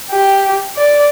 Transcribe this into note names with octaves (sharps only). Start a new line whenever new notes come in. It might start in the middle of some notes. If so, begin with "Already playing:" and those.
G4
D5